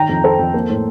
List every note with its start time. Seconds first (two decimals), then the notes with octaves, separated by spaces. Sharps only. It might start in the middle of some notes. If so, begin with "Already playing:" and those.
Already playing: D#3 G5 A#5
0.09 F2
0.24 F2 A4 C5
0.39 F2
0.54 A#3
0.70 A2